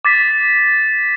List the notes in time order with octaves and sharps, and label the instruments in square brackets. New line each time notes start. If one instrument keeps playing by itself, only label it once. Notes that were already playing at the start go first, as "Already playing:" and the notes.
[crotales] D6 A6 B6